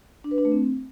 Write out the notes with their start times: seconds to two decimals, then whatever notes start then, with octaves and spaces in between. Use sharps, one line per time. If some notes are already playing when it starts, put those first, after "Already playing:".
0.24 D4
0.31 B4
0.38 D4
0.45 A3
0.52 C4